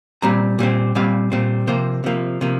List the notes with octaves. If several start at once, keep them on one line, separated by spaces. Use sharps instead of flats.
A#2 G3 C4 A#5
A#2 G3 C4
A#2 G3 C4 F5
A#2 G3 C4
C3 F3 A#3 C5
C3 F3 A#3
C3 F3 A#3